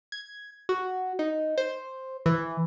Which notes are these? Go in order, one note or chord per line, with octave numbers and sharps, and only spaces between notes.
G#6
F#4
D#4
C5
E3